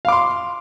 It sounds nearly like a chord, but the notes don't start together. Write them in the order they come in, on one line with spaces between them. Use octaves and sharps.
F5 D6 C6